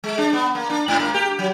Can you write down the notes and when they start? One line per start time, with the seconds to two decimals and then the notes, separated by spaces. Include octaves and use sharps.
0.04 G#3
0.18 D4
0.33 B3
0.55 A#3
0.70 D4
0.88 G#2
1.00 A#3
1.14 G4
1.39 F#3